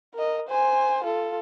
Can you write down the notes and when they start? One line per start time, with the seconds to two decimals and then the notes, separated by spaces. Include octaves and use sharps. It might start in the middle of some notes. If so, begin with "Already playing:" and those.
0.14 A#4 D#5
0.48 C5 G#5
1.04 F4 A4